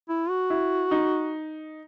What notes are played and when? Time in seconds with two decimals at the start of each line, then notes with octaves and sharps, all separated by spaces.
0.09 E4
0.29 F#4
0.50 E4
0.91 D#4